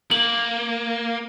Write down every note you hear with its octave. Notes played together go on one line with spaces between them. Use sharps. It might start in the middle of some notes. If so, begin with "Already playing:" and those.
A#3 F#7